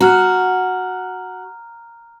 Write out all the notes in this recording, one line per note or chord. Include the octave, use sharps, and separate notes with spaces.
F#4 A#5 F6 F#6